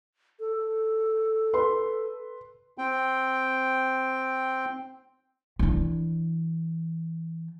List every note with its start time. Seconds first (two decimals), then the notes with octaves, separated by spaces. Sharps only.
0.40 A4
1.53 B4 C6
2.78 C4 G5
5.59 E3 D4